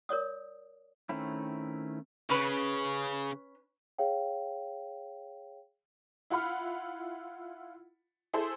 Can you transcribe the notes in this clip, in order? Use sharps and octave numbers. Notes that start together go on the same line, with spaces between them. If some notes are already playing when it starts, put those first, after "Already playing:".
A#4 C#5 D5 D#6
D#3 A3 C4 C#4 E4
C#3 C#4 B4
G#4 C#5 F5 G5
E4 F4 F#5 B5 F6
E4 G#4 A4 C5 C6